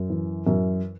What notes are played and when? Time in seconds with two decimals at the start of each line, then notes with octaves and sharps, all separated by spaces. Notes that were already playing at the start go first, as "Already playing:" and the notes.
Already playing: F#2
0.10 E3
0.47 F#2